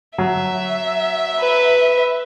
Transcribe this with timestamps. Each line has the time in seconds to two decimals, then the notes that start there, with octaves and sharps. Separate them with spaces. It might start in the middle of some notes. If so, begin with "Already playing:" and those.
0.18 F#3 E5
1.40 B4